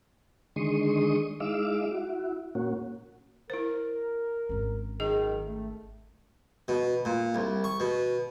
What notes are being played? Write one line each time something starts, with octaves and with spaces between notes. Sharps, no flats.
D3 D#3 G#3 C6 C#6 D#6
G#3 D#4 E4 F5 D6 E6
E4 F#4
A#2 A#3 C#4 F#4
E4 A#4 C5
G#1 C#4
F#2 D#3 G#4 D#5
A3
B2
A#2
C2
C#6
B2